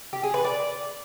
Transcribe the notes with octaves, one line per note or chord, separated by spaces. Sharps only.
G4
G#4
B4
D5